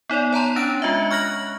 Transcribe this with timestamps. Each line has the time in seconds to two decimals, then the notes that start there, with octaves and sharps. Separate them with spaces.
0.09 B3 D#4 C#5 D5
0.33 C#5 A5 A#5 C6
0.56 C#4 D4 F#6 D7
0.82 G#3 F4 D#5 E5
1.11 C#6 F6 F#6 A#6 F#7